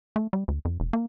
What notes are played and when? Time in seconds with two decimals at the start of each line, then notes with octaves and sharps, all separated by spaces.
0.16 A3
0.33 G3
0.48 D2
0.65 F2
0.80 E1
0.93 A#3